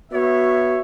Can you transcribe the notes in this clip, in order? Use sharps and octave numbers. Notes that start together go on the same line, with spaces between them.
B3 F#4 C#5 E5